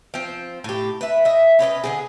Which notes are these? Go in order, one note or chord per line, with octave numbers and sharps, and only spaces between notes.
F3 C4
A2 G4
B4 E5
D#5 E5
C#4 B4 C5 D#5
D3 C4 G#4